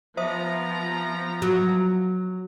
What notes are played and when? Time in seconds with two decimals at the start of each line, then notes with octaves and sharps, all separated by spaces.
0.17 F3 B3 C5 E5 A#5 D#6
1.42 F#3